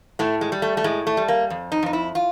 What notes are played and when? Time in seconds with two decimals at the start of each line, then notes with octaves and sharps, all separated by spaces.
0.19 A2 A3
0.41 G#3
0.52 G3
0.62 A3
0.77 A3
0.84 A2 G#3
1.07 A3
1.17 G3
1.28 A#3
1.50 F2
1.72 D#4
1.83 F2 D#4
1.93 E4
2.15 F4